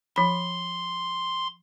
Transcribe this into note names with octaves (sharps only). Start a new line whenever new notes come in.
F3 B5 C6